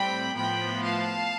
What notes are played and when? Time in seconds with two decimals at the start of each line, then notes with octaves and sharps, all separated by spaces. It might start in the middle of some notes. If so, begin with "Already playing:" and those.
Already playing: A2 G3 C4 G5 B5
0.35 A2 F3 B3 G5 B5
0.84 F5 A5